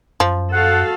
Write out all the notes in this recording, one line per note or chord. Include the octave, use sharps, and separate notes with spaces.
F#2 F3
F#4 A4 F5 F#5